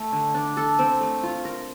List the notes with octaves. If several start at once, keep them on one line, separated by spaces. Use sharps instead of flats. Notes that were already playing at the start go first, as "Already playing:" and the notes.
Already playing: A3
D3
D4
A4
C4
A3
F4
A#4